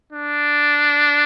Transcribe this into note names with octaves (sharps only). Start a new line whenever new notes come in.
D4